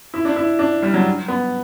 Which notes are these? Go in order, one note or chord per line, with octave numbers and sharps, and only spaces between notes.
E4
D4
E4
D4
G3
F#3
B3